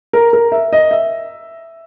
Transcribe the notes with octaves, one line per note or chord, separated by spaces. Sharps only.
A#4
A#4
E5
D#5
E5